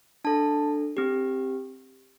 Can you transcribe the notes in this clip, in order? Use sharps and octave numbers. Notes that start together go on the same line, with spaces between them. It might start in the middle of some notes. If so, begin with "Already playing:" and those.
D4 A4 A5
C4 G4